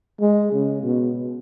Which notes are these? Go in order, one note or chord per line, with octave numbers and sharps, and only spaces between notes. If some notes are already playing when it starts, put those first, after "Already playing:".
G#3
C#3
B2